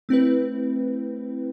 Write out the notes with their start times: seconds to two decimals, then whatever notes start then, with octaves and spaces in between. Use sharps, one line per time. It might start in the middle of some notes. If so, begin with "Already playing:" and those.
0.09 A3 C4 E4 B4